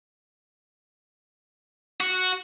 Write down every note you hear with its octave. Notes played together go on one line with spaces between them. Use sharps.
F#4